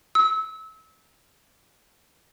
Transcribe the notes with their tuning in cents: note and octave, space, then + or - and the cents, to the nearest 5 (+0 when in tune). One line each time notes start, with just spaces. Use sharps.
E6 -30